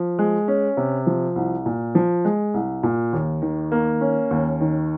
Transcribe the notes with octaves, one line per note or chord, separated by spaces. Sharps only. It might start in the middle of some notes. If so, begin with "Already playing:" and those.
Already playing: F3
G#3
C#4
C3
F3
C2
A#2
F3
G#3
C2
A#2
D#2
D#3
A#3
C#4
D#2
D#3